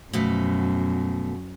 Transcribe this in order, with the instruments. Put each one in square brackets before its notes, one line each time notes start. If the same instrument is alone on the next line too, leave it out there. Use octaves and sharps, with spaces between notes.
[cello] F#2 [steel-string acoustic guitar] B2 F3 A3